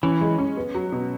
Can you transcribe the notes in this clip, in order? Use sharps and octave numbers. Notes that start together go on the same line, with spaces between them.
E3 C#4
G#3
C#4
B3
F#3
B2